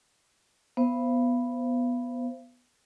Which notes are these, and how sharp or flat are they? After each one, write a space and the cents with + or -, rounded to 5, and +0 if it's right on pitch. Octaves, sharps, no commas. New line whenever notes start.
B3 -5 C5 +0 F5 -40